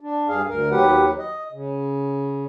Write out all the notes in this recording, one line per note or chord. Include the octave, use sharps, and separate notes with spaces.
D4
G2 G#4 F5
D2 A#4
D#2 F#3 G4 B4 F#5
D#5
C#3